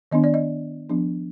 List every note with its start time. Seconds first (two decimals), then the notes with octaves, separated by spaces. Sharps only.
0.11 D#3 B3 D4 D#5
0.24 D5
0.34 D#5
0.89 F3 B3 D4